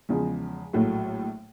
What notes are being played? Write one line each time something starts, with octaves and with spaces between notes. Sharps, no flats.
E2 C#3 F3 G#3
A#1 A2 F#3 A3